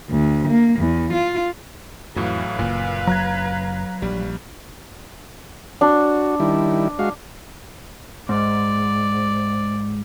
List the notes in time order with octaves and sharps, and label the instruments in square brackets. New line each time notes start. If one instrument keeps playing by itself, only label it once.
[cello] D2
A#3
E2
F4
[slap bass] F2 [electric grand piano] A2 E3 F#3 [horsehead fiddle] B4 F5
[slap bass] F#1 F#2 [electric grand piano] A#2
[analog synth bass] F#3 [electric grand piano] A#5 F#6 G#6
[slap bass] A#1 [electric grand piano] G3
[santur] D4 [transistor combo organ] F#4
[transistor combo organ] D#3 G3 E4
G#3 F#4 F5
[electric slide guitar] G#2 [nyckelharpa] D5